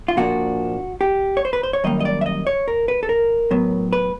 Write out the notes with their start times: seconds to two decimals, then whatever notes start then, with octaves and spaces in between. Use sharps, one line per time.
0.08 F4
0.17 A#2 F3 A#3 D4 F#4
1.01 G4
1.37 C#5
1.45 C5
1.53 B4
1.63 C5
1.73 C#5
1.84 F#2 D#3 G3 A#3 D#5
2.00 D#5
2.05 D5
2.21 E5
2.26 D#5
2.47 C#5
2.68 A#4
2.88 B4
3.03 A4
3.09 A#4
3.51 A2 F#3 B3
3.93 B4